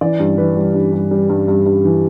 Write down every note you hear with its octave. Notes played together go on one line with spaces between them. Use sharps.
E3 D5
G2
E3 B4
G3
G2
G2
G3
G2
G2
G2
E3